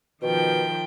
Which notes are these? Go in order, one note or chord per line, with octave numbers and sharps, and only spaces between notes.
B2 D#3 F3 G5